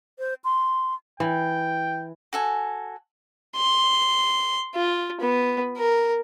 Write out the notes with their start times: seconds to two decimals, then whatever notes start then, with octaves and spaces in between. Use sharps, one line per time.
0.19 C5
0.44 C6
1.20 E3 G5
2.33 F#4 A4 G#5
3.56 C6
4.75 F4
5.20 B3
5.77 A#4